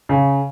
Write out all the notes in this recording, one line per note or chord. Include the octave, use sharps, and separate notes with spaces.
C#3